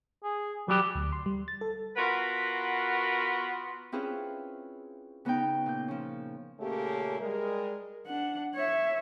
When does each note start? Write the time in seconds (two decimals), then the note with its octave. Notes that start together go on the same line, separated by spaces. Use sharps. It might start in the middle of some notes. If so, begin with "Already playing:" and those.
0.24 G#4
0.68 F#3 G3 G4
0.95 D2
1.12 C6
1.26 G3
1.48 A6
1.61 A4
1.97 B3 F4 F#4 A#4 B4
3.92 C4 C#4 E4 F4 G#4 B4
5.25 C#3 B3 C#4 D#4 G5
5.66 A#2 G6
5.88 F3 C#4
6.60 A#2 C#3 A3 A#3 C#4 G4
7.20 G3 G#3 A#4
8.07 D4 F#5
8.55 C#5 E5